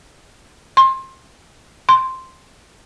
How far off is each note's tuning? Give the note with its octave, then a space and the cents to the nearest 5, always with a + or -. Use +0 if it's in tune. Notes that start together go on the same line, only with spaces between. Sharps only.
C6 +25
C6 +0